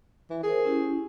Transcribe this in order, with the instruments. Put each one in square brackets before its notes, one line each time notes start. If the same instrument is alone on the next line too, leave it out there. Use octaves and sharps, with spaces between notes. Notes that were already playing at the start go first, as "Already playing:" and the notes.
[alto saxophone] E3
[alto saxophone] G#4 [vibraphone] A#4 C5
[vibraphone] C#4 E4 G4